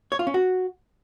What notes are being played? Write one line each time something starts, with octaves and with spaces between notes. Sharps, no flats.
C#5
F4
C#4
F#4